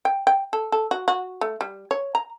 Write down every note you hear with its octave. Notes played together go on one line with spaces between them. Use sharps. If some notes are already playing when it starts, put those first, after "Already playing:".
G5
G5
A4
A4
F#4
F#4
A3
G3
C#5
A#5